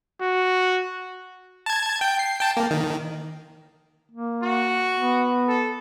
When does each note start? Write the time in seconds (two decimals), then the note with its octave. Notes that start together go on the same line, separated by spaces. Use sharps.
0.21 F#4
1.66 A5 G#6
2.01 G5
2.19 C7
2.40 G5 A5
2.57 A#3
2.71 D#3
4.12 A#3
4.42 F#4
4.98 B3
5.48 A4